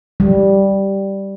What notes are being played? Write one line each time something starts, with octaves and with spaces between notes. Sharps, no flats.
G3